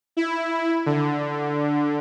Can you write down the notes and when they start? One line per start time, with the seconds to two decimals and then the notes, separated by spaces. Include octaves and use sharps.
0.17 E4
0.86 D3